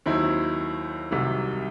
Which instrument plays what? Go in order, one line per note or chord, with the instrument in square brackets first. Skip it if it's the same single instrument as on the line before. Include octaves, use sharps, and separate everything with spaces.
[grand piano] D#2 D#3 F#3 C4 E4
C2 C3 D#3 F#3